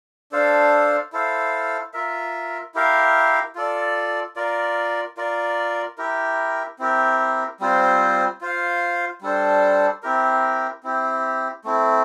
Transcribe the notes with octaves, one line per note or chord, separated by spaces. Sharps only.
D4 A4 C5 F5
E4 A4 C5 F5
F4 A#4 E5
E4 G4 A#4 F5
F4 A4 D5
F4 A#4 D5
F4 A#4 D5
E4 G4 A#4
C4 E4 G4 A#4
G3 C4 F4 C5
F4 C5 F5
G3 D4 A4 C5
C4 E4 G4 A#4
C4 E4 G4
A3 C4 E4